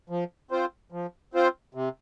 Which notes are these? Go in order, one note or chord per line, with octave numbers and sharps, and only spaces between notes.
F3
C4 F4 C5
F3
C4 F4 C5
C3